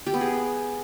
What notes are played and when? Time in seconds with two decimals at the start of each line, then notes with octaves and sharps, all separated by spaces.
0.06 G4
0.14 B3
0.21 G#4